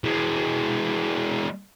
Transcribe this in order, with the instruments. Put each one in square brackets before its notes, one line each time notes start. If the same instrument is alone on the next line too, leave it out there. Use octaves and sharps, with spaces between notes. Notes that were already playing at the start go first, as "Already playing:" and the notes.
[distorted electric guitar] E3 G#3